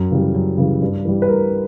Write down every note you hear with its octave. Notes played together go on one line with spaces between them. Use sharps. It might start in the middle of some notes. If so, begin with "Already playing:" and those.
Already playing: F#2
C#3 E3 G3
F#2
C#3 E3 G3
G2
E3 G3
B4
G2 A#4